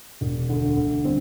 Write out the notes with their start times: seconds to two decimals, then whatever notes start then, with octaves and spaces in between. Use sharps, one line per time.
0.21 E1
0.49 D2 D3
0.76 D2
1.04 D3 G3 C4